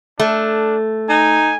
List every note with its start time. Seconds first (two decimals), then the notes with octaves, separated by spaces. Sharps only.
0.20 A3 D4
1.09 D#4 G#5